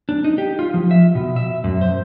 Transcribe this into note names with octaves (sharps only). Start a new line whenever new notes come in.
D4
D#4
G4
F4
F3
E5
B2
E5
F#2
C5